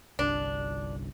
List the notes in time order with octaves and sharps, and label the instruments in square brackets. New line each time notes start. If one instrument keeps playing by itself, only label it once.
[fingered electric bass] G1 C2 [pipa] D4